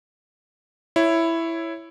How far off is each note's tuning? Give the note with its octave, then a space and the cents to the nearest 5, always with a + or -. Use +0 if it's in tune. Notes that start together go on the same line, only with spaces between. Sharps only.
E4 +5 C#5 +0